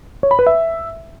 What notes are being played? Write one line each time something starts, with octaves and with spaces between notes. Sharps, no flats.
C#5
B5
B4
E5